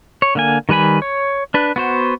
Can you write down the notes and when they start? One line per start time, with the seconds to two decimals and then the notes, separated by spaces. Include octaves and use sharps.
0.22 C#5
0.35 D3 A#3 G#5
0.69 D#3 G3 B4 G#5 B5
1.02 C#5
1.54 D4 B4
1.76 B3 F#4 C5